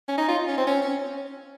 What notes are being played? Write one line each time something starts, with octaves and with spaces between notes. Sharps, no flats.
C#4
D#4
F4
C#4
C4
C#4
C#4